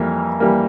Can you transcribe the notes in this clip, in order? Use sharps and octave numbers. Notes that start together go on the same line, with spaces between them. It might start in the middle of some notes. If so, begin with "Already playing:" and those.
Already playing: F2 E3 G3 A#3
E3 G3 A#3